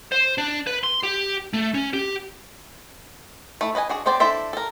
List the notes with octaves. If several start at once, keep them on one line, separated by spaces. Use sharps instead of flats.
C5
D4
B4
C6
G4
A3
C#4
G4
A3 E4
B4 D#5 F5 G#5
D4 F#4 G#4
B3 C4 C5 D5 G5
D4 E4 A4 C5 E5
A4 A#4